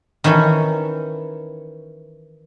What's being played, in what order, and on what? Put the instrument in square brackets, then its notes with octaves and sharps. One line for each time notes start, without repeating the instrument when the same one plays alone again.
[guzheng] D#3 E3 C#4 E4 A4